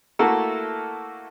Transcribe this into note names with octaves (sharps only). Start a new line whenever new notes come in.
A3 A#3 E4 F#4 A4 A#4